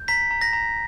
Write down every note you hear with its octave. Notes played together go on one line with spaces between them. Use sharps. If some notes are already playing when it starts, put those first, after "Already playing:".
Already playing: G6
A#5 B6
A#5
A#6
A#5